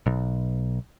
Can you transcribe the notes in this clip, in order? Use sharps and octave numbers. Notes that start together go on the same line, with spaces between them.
B1